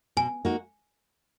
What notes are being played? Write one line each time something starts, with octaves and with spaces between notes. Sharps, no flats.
B2 G#5
A#3 D#4 F#4